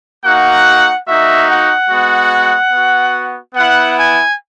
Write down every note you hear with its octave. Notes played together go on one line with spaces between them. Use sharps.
A#3 D#4 F#4 F#5
A#3 D#4 F#4 E5
F#5
G#3 B3 F#4
B3 F#4
B3 E4 F#5
G#5